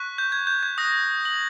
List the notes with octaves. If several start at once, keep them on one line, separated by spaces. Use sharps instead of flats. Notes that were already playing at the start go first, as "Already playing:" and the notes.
Already playing: C#6 F#6 B6
G6
G#6
G6
G#6
D#6 F#6 A#6
F#7